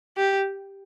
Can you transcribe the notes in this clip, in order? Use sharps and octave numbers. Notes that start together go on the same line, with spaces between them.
G4